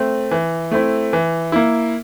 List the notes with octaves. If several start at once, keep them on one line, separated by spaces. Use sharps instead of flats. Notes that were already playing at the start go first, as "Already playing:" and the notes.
Already playing: A3 C4
E3
A3 C4 E4
E3
A#3 E4